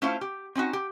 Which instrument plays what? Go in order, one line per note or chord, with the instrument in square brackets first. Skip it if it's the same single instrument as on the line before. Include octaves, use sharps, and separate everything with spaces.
[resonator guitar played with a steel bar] A3 C#4 E4 F4 C5 F5
G4
C4 C#4 D#4 F#4
G4